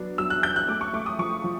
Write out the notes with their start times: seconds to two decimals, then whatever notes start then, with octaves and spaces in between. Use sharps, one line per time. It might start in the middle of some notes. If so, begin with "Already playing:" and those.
Already playing: F#3 B3 D4
0.18 F#3 E6
0.30 F#6
0.43 F#3 G6
0.56 F#6
0.68 A3 D6
0.81 C#6
0.93 A3 D6
1.06 D#6
1.18 F3 C#6
1.44 F3